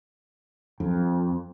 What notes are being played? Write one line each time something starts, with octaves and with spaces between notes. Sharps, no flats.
F2